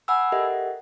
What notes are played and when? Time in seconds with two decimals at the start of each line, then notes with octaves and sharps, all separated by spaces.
0.08 F#5 G#5 B5 E6
0.32 G4 A4 A#4 D#5 E5 F#5